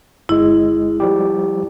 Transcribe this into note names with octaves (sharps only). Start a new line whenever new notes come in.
G1 G#3 E4
F3 G3 G4